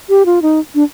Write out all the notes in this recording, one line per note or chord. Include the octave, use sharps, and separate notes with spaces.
G4
F4
D#4
D4